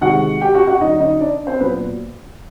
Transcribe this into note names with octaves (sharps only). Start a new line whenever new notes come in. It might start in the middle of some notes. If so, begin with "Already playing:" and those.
C3 D#3 G#3 F#4 F#5
G4 G5
F#4 F#5
F#4 F#5
D3 F#3 D#4 D#5
D#4 D#5
D4 D5
C4 C5
A#2 F#3 B3 B4